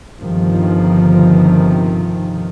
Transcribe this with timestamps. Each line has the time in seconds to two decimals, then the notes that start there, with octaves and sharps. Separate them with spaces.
0.21 G1 C3 D#3 F3